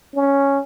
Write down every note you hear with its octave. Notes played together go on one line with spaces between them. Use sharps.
C#4